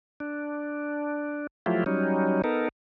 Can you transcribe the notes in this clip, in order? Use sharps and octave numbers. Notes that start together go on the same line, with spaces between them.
D4
F3 F#3 A3 E4 F4 G4
F#3 G3 C#4 D#4
B3 D#4 A4 A#4